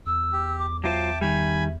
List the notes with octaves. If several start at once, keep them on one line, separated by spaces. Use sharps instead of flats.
E2 E6
G4
D6
F#3 F4 C5 E5 G5 A5 D6
D#3 G3 G#5 B5